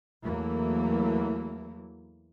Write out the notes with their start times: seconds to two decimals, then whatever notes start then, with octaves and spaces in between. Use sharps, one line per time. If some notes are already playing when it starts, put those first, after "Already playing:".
0.23 E2 E3 F#3 A3 A#3